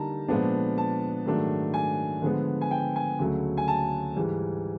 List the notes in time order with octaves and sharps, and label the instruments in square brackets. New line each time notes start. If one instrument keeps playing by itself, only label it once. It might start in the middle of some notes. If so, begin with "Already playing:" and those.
Already playing: [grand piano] D3 G3 A#3 D#4 A5 A#5
A#2 F3 G#3 B3 D4
A5
G#2 D#3 F#3 A3 D4
G#5
D3 F3 G#3 B3
G#5
G5
G#5
D2 C#3 F#3 A3
G#5
A5
G#2 E3 G3